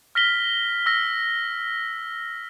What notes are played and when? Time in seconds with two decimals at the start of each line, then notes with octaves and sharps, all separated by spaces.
0.15 F6 A#6 B6 G7
0.86 E6 A#6